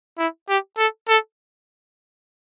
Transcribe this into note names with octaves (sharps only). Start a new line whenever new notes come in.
E4
G4
A4
A4